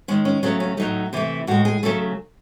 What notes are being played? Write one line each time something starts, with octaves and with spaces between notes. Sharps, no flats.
D#3 G#3 C#4
C#4
C#3 F#3 A3 C#4
C#4
A2 F#3 A3 D#4
C3 E3 A3 E4
A2 G#3 F#4
G#4
C#3 F#3 A3 A4